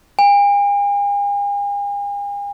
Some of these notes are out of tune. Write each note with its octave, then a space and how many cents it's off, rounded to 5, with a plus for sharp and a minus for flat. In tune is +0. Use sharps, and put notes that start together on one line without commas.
G#5 -45